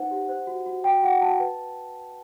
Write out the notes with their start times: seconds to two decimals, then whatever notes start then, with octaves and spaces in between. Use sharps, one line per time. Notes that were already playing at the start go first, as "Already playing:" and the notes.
Already playing: D#4 B4 C5 F#5
0.11 G4
0.29 C5
0.47 F#4
0.66 F#4
0.84 F#4 G5
1.03 F#4 F#5
1.21 F#4 A5
1.40 B4